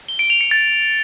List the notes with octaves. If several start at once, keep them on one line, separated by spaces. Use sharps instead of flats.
G7
D7
F7
C#7
A6